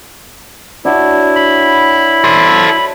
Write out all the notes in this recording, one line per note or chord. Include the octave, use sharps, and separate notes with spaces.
D4 E4 F#4 C#5
B5
A4 C5